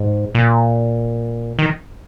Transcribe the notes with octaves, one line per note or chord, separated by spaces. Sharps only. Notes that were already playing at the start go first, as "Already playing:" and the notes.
Already playing: G#2
A#2
D#3